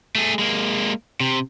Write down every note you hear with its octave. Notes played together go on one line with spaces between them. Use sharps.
A3 G#4
G#3 A#3
C3